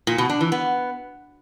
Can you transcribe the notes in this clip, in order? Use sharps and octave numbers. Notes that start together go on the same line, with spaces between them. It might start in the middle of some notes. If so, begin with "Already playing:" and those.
A#2
B2
D4
E3
B3